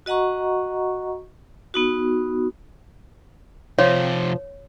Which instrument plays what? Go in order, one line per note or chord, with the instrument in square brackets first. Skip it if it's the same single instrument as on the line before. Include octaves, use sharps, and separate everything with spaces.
[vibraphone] F#4 D#5 F#5 A#5 C#6
B3 D#4 F#4
[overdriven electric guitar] F2 C3 [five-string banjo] F3 [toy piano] C#5